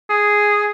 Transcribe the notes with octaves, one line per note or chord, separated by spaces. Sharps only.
G#4